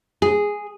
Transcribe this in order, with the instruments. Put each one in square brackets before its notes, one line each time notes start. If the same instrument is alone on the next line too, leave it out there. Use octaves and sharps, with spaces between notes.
[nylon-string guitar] G#4